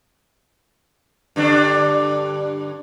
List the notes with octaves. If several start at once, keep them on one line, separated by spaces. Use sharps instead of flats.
G2 D3 D4